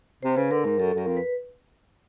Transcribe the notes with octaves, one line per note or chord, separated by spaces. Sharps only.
C3 C5
C#3 B4
D3 A#4
G#2 A#4
F#2 A4
F#2 A#4
F2
B4